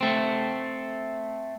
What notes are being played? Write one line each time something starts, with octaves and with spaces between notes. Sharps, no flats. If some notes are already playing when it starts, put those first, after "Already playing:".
A3 C4